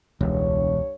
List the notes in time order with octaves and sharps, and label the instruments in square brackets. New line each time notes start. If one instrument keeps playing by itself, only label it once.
[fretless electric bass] E1 [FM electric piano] C#2 [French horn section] G2 C#5